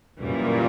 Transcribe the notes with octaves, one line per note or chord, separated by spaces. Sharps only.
F#2 A#2 C#3 E3 G3